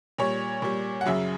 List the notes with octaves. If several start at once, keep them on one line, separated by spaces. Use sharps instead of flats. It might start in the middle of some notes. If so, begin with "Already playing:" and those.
A#2 G3 C#5
A#2 G3
F#5
F#2 C#3 F#3 E5